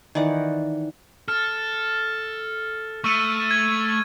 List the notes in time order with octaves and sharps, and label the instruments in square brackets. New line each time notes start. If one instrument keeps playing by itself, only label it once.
[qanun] D#3 E3 D5 F#5
[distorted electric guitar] A4 [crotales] F6
[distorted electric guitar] A3 [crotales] C#6 E6 D#7
[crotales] G#6